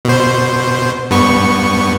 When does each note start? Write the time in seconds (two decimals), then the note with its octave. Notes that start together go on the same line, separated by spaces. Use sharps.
0.05 B2 C5
1.11 G2 B3 C#6